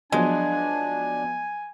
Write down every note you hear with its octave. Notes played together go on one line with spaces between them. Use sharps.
F3 F#3 G#3 B3 D4 G#5